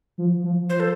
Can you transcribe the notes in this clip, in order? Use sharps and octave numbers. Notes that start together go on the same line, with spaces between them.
F3
F3
F3 C5
A4